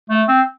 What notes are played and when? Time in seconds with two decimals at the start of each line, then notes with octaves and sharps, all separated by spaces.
0.10 A3
0.28 C4